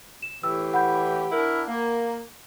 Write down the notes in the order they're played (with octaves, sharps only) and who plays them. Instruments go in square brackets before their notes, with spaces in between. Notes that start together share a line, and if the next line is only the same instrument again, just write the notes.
[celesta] E7
[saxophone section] A2 E3 G4 [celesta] E6
[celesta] F#5 B5 G6
[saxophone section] D4 E4 A#4
A#3